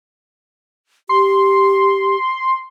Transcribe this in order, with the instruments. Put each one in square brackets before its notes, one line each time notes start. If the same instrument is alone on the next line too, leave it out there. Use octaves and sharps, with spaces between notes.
[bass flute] G4 [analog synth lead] C6